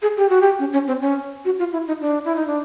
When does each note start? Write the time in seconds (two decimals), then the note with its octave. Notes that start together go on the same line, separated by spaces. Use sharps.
0.02 G#4
0.17 G4
0.29 F#4
0.41 G4
0.59 C#4
0.73 C#4
0.88 C4
1.01 C#4
1.45 F#4
1.59 F4
1.73 E4
1.87 D#4
2.01 D4
2.25 E4
2.36 D#4
2.47 D4